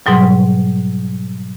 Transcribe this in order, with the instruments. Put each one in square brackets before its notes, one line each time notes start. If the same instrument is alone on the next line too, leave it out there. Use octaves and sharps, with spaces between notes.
[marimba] G#2 B2 F#3 G3